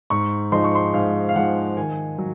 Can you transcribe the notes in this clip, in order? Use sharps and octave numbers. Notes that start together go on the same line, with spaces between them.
G#2 C#6
F3 G#3 D#4 C6
C#6
C6
G#2 F5
F5
F3 G#3 D#4 F#5
D#3 G#5
F#3